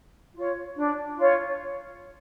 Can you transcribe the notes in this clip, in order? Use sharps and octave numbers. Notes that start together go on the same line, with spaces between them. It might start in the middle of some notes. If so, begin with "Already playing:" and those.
F4 C#5
D4
F4 C#5